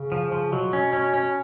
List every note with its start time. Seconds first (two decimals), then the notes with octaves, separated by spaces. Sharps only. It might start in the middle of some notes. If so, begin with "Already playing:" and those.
Already playing: C#3
0.12 F3
0.32 F3
0.52 B2 F#3
0.73 C#4
0.93 C#4
1.14 C#4